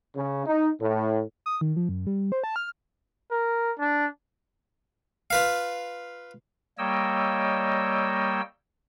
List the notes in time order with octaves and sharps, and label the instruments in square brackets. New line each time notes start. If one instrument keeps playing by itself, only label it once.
[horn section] C#3
D#4
A2
[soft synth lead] D#6
D#3
F3
F#2
G3
C5
A5
F6
[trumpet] A#4
D4
[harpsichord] F4 B4 F5
[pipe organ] G3 A#3 C#5 D#5 G5 E6